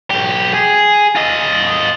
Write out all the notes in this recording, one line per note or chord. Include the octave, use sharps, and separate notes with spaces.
B1 G4
G#4
F4 D#5